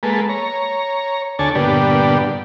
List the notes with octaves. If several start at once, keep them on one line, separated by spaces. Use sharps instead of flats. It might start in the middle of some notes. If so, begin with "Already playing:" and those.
G#3 A#3 A4 B4
C#5 A#5
D2 D4 A4 C#5 G#5 A5
G2 A#2 D3 B3 D4 G4